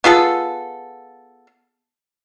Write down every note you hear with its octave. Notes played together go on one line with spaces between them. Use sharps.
B3 F4 G#4 A4